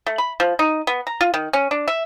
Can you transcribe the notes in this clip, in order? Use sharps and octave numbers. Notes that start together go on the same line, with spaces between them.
A3
B5
F3
D#4
B3
A#5
F4
D#3
C#4
D4
E5